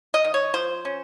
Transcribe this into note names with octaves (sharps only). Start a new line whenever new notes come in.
D#5
D#3
C#5
F3 C5
C#4